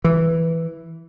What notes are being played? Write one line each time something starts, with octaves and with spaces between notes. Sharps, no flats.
E3